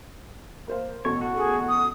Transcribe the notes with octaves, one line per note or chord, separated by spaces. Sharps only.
A#3 C5 F5
A1 B2 A4 C#5
F#4
G#4
D#6